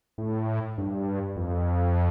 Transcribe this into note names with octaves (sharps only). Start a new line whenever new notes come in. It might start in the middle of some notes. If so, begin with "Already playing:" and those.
A2
G2
F2